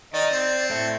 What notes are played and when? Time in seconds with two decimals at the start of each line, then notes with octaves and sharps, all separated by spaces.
0.14 D#3 D5 D#5
0.32 C4
0.70 A2 A4 E5